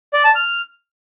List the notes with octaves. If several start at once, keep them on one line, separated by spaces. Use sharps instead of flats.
D5
A5
F6